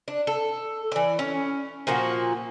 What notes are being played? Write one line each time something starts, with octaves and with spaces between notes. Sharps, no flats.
D4
A4
E3 D5
C#4
A#2 F3 A#3 F#4